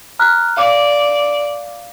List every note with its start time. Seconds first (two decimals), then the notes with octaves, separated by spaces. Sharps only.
0.19 A#5 F6 F#6
0.57 D5 F5 D6